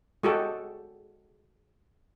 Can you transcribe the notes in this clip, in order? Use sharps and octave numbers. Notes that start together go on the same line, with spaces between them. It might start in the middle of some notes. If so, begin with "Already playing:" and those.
G#3 F#4 G4 A4